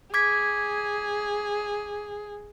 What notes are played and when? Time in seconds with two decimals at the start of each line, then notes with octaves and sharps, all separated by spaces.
0.14 G#4 D6 G#6 B6